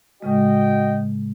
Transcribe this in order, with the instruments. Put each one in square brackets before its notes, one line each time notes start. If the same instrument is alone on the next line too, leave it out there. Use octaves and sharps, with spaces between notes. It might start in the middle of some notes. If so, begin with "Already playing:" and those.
[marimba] A2 C#3 G#3 [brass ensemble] F#4 D#5 G5